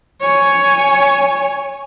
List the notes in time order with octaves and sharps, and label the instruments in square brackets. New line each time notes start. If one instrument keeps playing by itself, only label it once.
[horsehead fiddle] C#5 G#5